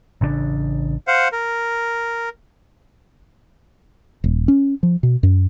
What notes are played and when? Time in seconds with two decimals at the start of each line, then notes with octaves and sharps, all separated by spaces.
0.21 A1 C#3 C4 D4
1.07 C5 F5 F#5
1.32 A#4
4.24 D#1
4.48 C#4
4.83 F3
5.03 B2
5.23 F#2